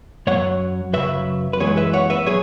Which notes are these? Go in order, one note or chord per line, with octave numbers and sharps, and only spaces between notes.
F#2 F#3 C#5 F#5
F#2 C#3 F#3 B4 E5
B4
F#2 E3 G#3 G#4 C#5
B4 E5
C#5 F#5
B4 E5
F#3 G#4 C#5